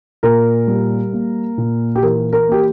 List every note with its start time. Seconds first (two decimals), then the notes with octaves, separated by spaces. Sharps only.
0.23 A#2 A#4
0.68 G3
1.13 A#3
1.58 A#2
1.96 G4
2.02 E3 A#4
2.33 A#4
2.48 A#3 G4